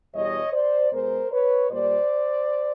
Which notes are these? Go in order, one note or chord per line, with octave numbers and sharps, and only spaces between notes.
E2 B2 G3 C#5 D#5
C5 D5
B2 G#3 B3 A#4 C5
B4 C#5
A#2 G3 A#3 C5 D5